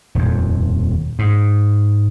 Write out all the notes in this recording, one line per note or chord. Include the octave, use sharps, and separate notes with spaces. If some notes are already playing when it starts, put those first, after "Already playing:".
D#1 F2
G#2